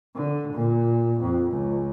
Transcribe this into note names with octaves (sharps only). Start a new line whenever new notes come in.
D3
A#2
F2
C#2